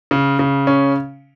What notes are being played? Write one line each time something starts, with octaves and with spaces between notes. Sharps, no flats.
C#3
C#3
C#4